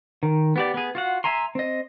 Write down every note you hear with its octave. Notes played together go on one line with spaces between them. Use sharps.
D#3
B3 G4 D5
B3 G#4
F4 F#4 F#5
E5 G#5 A#5 C6
C4 D#5